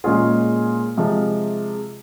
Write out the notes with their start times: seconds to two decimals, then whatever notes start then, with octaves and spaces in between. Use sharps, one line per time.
0.04 A#2 G#3 C#4 F4 G#4
0.97 C3 F3 G#3